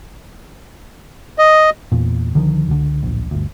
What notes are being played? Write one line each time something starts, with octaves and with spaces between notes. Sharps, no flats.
D#5
E2 A#2
C#2 D3 D#3 F3
C#2 D3
D1 A#1
G1 D2